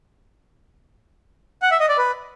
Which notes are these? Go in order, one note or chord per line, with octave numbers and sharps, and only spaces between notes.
F#5
E5
D#5
D5
B4